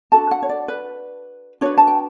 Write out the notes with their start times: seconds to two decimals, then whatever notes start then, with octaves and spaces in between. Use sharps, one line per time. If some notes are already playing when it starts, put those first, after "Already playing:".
0.12 D4 F#4 A4 A5
0.31 F#5
0.42 C#5
0.49 D5
0.68 B4
1.61 D4 F#4 B4 C#5
1.77 A5
1.87 G5